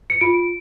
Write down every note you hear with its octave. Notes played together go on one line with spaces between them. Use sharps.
C#7
F4 D7